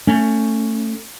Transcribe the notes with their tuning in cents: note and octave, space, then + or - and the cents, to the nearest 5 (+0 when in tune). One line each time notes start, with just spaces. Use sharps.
A3 +25 C#4 +0